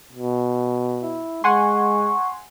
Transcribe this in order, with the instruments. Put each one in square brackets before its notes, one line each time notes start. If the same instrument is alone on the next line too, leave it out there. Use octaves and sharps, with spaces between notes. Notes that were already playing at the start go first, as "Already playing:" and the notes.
[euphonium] B2
[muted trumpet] E4
[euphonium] G#3 [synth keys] F#5 G#5 C6 [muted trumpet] C#6